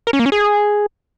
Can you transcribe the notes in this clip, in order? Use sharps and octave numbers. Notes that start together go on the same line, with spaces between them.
A#4
C#4
A#3
C#4
G#4